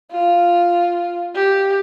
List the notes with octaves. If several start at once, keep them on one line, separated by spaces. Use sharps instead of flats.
F4
G4